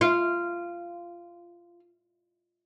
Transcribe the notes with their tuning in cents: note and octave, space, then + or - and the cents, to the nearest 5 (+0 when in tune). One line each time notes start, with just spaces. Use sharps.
F4 -15